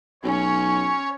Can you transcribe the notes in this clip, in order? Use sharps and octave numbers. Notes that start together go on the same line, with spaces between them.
B1 C#4 C#5